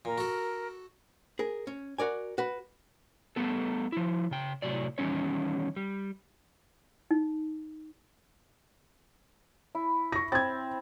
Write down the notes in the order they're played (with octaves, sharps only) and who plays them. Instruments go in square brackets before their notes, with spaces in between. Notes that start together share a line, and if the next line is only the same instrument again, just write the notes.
[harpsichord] A#2 [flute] A#4
[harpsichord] F#4 A4
[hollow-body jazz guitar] G#4 A#4
C#4
F#4 A#4 D5 G#5
F#4 B4
[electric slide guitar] G3 A3 B3 A4
F3 E4
C#3 G5
A2 C3 F#3 D5
D#3 E3 G3 C#4 C#5
G3
[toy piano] D#4
[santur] E4
[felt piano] C#6 A#6
[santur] C4 [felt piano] G#6 A6